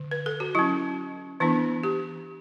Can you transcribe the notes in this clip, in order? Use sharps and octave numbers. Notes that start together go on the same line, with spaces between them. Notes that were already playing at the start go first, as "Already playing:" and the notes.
Already playing: D3
B4
A4
F#4
F#3 C#4 E4
E3 B3 D4 E4
G4